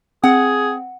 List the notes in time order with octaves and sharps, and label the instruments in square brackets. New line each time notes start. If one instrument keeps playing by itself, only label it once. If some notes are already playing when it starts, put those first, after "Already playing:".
[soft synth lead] C4 [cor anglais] G#4 [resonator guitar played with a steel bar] F#5